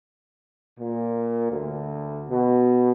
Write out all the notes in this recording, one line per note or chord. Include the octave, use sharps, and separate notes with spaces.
A#2
D2
B2